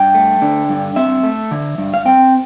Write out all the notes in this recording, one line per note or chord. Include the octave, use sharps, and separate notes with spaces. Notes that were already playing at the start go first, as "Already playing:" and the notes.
Already playing: G2 G5
A3
D3
G2
C4 E5
A3
D3
G2
F5
C4 G5